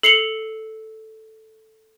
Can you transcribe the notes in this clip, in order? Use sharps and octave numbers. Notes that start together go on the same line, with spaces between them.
A4 C7 C#7 F7 G7